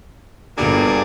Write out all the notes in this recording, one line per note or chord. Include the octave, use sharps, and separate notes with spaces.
G1 F#3 G3 A#3 D4 G#4